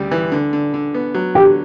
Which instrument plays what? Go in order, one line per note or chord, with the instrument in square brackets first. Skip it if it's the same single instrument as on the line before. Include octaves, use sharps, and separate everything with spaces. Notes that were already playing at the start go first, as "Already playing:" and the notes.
Already playing: [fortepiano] D2 C#3 G3
E3
D3
D3
D3
B3
F#3
[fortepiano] D3 [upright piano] G4